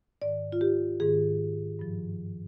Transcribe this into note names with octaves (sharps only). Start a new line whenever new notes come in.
G#2 D#3 D5
F4
G4
G#2 D#3 G#4
G2 F3